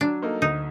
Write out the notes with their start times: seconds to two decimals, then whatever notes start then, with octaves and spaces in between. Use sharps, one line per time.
0.01 F#3 D4
0.22 A#3 D#4 A4
0.42 D2 D#4